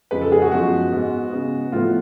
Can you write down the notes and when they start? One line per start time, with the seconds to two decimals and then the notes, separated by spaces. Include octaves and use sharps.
0.11 F2 C#3 G#3 B4
0.21 A4
0.32 G#4
0.42 F#4
0.52 F#2 F3 G#3 B3 F#4
0.92 G#2 G#3 B3
1.32 C#3 G#3 B3
1.72 A2 F3 B3 F4